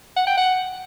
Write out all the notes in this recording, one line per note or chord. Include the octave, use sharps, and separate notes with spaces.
F#5
G5
F#5